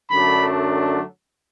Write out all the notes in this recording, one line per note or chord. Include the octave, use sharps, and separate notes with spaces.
F#2 D3 F#3 A3 D4 B5